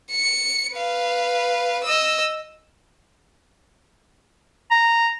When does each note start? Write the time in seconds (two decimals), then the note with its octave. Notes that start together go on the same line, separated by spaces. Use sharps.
0.11 C#7
0.74 B4 F5
1.84 D#5 E6
4.71 A#5